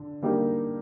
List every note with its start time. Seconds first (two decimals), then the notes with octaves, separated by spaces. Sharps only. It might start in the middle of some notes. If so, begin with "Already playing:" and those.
Already playing: D3
0.22 D3 G3 A#3 D#4 G4